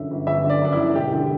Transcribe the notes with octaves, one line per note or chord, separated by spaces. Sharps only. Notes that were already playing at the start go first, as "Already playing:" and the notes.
Already playing: G1 F#2 D3 E5
G1
G1 E5
D3
D5
F#2 D4
E4
G1
E1 G4
D3 G4